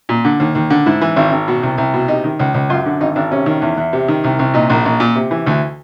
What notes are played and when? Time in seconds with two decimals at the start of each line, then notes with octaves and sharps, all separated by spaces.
0.09 A#2
0.25 D3
0.40 D#2
0.55 D#2
0.70 D3
0.86 G#2 E4
1.01 E3
1.16 G#1
1.32 G#1
1.48 B2
1.63 C2
1.78 C2
1.94 B2
2.08 C3 D#4
2.24 D#3
2.39 C#2
2.54 C#2
2.70 F#2 F4
2.86 D3
3.01 G#1 D#4
3.16 G#1 D4
3.31 C3 C#4
3.46 D#3
3.62 E2
3.78 E2
3.93 C3
4.08 D#3
4.24 C2
4.39 C2
4.54 A#2 D#4
4.70 A#1
4.85 A#1
5.00 A#2
5.15 C3
5.31 E3
5.47 D2